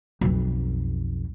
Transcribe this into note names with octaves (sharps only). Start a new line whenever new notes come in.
B1 F2